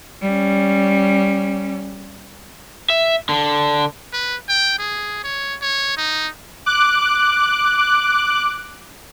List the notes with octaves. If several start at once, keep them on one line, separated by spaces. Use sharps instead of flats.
G3 C#4
E5
D3
B4
G5
G#4
C#5
C#5
D#4
D6 F#6